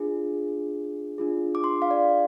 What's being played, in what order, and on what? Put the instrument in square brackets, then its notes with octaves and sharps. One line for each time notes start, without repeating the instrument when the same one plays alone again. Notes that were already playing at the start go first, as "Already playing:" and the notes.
Already playing: [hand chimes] D4 F4 G#4
D4 F4 G#4
D6
C6
F5
D5